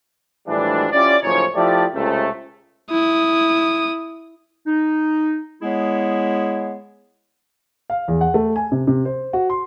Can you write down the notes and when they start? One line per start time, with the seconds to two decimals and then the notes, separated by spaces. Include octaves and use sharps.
0.48 A2 E3 F3 G3 G#3 D4
0.92 C#4 E4 F4 G4 D5
1.23 F#1 A2 F3 C#4 D#4 C#5
1.55 F3 A3 E4 G4 D5
1.94 C#2 C3 A3
2.90 E4 D#6
4.66 D#4
5.61 G#3 B3 E4 G#4 C#5
7.90 F5
8.08 E2
8.21 F#5
8.34 A3
8.56 G#5
8.72 C3
8.87 C3
9.05 C5
9.33 F#4
9.50 C6